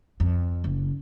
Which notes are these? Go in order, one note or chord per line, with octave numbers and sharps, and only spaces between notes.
F2
F#1